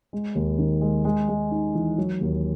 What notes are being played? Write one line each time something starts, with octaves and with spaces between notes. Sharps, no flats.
G#3
D#2
D#3
G#3
G#3
G#3
D#4
E3
F#3
D#2